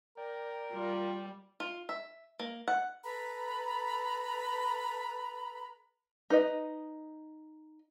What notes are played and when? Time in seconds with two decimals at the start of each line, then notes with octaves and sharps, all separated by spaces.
0.17 A#4 D5 G5
0.72 G3 F4
1.60 F4
1.89 E5
2.39 A#3
2.68 F#5
3.03 A4 B4 A#5 B5
6.30 D#4 B4 D#5